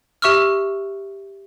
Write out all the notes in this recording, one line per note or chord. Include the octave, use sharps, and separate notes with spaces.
G4 E5 C#6 E6 F6